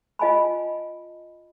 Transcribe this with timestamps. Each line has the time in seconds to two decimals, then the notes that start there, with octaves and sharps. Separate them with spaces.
0.19 F4 D#5 G#5 A5 B5